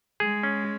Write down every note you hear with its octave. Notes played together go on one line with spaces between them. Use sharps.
G#3 G#4
C#4